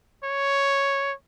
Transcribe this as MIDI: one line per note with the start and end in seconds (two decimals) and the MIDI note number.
0.24 1.13 73